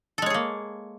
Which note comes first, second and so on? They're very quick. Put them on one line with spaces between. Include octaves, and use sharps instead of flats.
A4 G#3 C#5 G#4 A#3